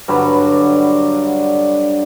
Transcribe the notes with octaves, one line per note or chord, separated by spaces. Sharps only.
G2 D3 F#3 B5